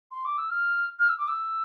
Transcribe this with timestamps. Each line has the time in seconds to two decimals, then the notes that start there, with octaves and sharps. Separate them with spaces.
0.11 C6
0.25 D6
0.38 E6
0.50 F6
0.99 F6
1.09 E6
1.18 D6
1.28 E6